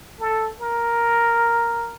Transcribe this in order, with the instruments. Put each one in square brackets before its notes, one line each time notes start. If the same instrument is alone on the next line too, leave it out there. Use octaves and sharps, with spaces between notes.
[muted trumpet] A4
A#4